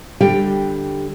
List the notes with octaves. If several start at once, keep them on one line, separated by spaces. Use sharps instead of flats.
D3 G3 G4 G5